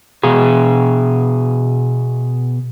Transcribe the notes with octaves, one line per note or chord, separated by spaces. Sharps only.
B2 G#4